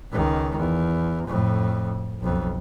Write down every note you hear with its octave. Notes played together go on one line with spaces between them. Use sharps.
C#2 D#3
E2
F2 A2
B1 F2